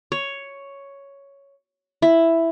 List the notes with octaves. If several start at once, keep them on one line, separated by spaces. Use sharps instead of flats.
C#5
E4